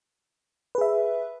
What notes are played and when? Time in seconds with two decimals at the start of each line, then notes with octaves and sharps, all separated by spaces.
0.75 B4
0.78 G#4
0.81 E5